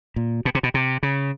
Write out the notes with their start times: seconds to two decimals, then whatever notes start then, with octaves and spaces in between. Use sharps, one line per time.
0.16 A#2
0.45 B2
0.55 C3
0.63 B2
0.74 C3
1.03 C#3